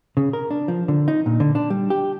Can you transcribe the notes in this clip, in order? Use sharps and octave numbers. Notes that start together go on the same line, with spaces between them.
C#3
A#4
D4
F3
D3
D#4
A#2
D3
D4
G3
G4